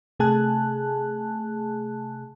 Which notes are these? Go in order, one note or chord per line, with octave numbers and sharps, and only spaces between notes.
C3 A3 G#4 G#5 A5 F#6